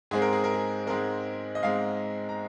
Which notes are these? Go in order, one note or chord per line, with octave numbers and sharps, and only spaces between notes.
G#2 G#3 C4 G#4
A#4
G#4
A#4
G#4
G#2 G#3 C4 A#4
D#5
G#2 G#3 C4 F5
A#5